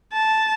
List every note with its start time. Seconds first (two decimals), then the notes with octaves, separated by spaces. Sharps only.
0.13 A5